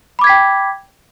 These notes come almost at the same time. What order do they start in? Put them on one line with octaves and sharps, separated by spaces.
B5 D6 G#6 B6 G5